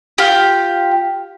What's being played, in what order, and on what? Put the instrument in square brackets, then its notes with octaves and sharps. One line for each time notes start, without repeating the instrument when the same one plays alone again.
[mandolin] F4 G4